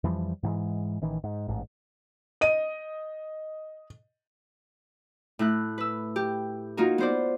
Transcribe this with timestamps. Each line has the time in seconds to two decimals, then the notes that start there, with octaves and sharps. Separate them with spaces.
0.04 F2 E3 F3 G3
0.43 G#2 E3 F3 G#3
1.02 A1 D#3 E3
1.24 G#2
1.48 A1 G#2
2.41 D#5 D#7
5.39 A2 E4 F#6
5.78 B4 E6
6.16 G4
6.77 A#3 D#4 F4 F#4 A#4
6.98 B3 C5 D5